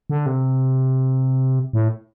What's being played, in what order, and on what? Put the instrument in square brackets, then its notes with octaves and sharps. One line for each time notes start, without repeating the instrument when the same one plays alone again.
[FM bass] D3
C3
A2